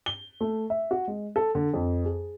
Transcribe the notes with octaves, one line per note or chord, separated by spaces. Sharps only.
G7
A3
E5
F#4
G#3
A4
D3
F2
G#4